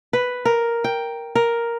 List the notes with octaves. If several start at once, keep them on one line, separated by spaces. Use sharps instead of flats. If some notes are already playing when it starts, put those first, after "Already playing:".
B4
A#4
G5
A#4